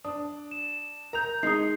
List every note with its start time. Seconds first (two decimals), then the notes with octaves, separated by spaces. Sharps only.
0.05 D4 D#6
0.51 E7
1.13 A#4 A#5 G6 F7
1.43 G#3 D#4 D#6 C7